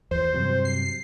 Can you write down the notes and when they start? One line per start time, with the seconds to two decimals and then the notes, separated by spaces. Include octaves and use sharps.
0.11 E2 C5
0.33 G2 C3 F#3
0.65 C7